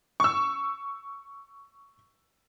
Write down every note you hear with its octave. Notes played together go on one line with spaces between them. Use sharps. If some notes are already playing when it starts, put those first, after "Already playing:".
C#6 E6